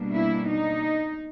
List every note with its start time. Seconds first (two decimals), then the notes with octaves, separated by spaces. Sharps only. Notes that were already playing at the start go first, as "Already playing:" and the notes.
Already playing: B2 G3 A#3 D4
0.13 E4
0.48 D#4